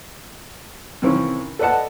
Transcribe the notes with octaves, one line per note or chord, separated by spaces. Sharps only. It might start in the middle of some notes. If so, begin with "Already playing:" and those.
C3 D#3 E3 A#3 C4 C#4
A4 B4 D5 D#5 F#5 A5